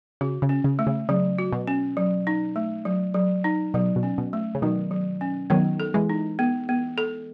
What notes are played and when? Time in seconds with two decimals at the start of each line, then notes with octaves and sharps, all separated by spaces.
0.21 C#3 F#4
0.42 C#3
0.49 C#4
0.64 C#3
0.79 A3
0.87 C#3
1.09 C#3 F#3
1.38 F#4
1.53 B2
1.68 C#4
1.97 F#3
2.27 D#4
2.56 A3
2.85 F#3
3.14 F#3
3.44 D#4
3.74 B2 F#3
3.96 B2
4.03 C#4
4.18 B2
4.33 A3
4.55 C#3
4.62 B2 D#3 F#3
4.91 F#3
5.21 C#4
5.50 D#3 F#3 B3
5.80 A4
5.94 E3 G#3
6.09 D#4
6.39 B3
6.69 B3
6.98 A4